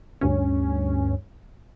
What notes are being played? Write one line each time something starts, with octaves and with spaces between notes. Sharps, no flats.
D2 G2 C#4